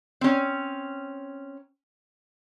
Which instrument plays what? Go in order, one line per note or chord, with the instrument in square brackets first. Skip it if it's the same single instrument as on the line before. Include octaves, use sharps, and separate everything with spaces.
[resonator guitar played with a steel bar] C4 C#4